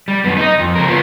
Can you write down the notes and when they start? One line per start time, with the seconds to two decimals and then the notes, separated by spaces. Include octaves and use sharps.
0.08 G3
0.24 F#2 B3
0.37 D#4 D#5
0.59 F2
0.76 C#2 A#4
0.88 B3 F4